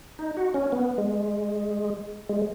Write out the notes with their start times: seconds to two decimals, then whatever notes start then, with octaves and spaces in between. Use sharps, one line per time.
0.19 D#4
0.37 F#4
0.54 C#4
0.72 B3
0.98 G#3
2.29 G#3